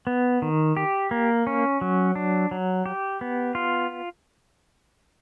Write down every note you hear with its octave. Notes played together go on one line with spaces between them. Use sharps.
B3
D#3
G4
A#3
C#4
F#3
D4
F#3
G4
B3
F4